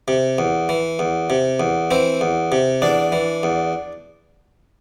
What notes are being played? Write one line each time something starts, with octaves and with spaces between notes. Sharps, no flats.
C3
E2
E3
E2
C3
E2
E3 C4
E2
C3
E2 D4
E3
E2